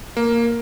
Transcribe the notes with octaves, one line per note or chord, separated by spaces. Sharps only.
A#3